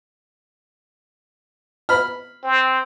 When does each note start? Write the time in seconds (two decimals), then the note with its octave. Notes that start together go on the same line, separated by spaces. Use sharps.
1.89 B5 F6
2.44 C4